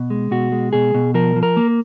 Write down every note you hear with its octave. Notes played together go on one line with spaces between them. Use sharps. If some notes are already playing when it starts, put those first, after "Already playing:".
Already playing: B2
G#3
B2 F#4
G#3
B2 G#4
B2
F3 A#4
F3
A#4
A#3